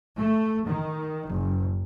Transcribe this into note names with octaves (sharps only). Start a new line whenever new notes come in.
A3
D#3
F#1